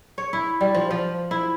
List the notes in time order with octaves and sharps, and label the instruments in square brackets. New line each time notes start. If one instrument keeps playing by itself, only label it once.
[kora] C#5
E4
G3
F3
F3
E4